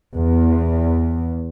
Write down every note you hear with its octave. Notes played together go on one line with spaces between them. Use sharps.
E2